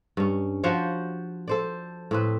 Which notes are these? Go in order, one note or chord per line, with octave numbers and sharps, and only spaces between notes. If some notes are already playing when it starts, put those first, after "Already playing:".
G2 C#4
F3 F#4 C5 C#5
A4 C5 D5
A2 C4 B4